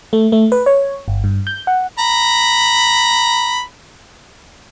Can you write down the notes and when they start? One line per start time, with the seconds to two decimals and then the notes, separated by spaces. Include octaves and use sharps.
0.13 A3
0.32 A3
0.52 B4
0.66 C#5
1.08 G1
1.24 G2
1.47 G6
1.67 F#5
1.99 A#5 B5